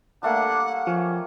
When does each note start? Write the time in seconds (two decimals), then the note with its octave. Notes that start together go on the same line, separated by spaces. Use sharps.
0.23 G3 A3 A#3 D4 F#5
0.87 F3 C#4